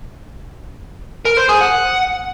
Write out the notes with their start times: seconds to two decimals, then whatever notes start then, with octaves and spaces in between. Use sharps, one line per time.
1.25 A#4
1.37 C5
1.49 G#4
1.61 F#5